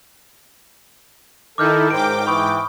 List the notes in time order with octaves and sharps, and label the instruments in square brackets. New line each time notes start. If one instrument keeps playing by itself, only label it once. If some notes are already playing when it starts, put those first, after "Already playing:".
[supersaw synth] D#3 D#4 E4 [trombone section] A4 [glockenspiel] D6 F6 G6
[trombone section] C#2 A#4 C5 [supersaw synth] G#2 G5 D6 [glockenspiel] D7
[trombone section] E3 [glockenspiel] B5 C#6 D#6